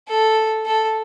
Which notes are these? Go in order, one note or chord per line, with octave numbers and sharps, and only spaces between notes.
A4
A4